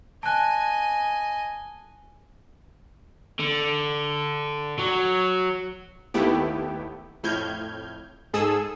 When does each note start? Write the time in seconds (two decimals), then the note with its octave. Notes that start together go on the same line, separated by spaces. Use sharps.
0.23 D#5 G#5 A5 F#6
3.40 D3
4.79 F#3
6.14 D#2 A3 B3 E4 G4
7.23 F2 A2 F6 G6 G#6
8.34 G#2 G#4 A4 D#6 E6